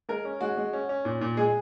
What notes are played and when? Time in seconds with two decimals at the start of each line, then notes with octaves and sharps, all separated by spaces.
0.09 G#3 A#4
0.25 C#4
0.41 G#3 F#4
0.57 G#3
0.73 C#4
0.89 C#4
1.05 A#2
1.21 A#2
1.37 G#3 G#4